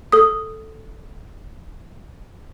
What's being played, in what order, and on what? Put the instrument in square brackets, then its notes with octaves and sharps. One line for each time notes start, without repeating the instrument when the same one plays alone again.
[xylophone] A4 D#6